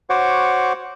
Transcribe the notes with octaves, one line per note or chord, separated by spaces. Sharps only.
F#4 C5 C#5 F#5 C#6 D6